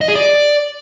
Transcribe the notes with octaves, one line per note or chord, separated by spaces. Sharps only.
D#5
G#4
D5